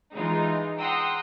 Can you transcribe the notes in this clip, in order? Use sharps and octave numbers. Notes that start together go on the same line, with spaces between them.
E3 G#3 D#4 F4
F#5 G5 A#5 C6 D#6 E6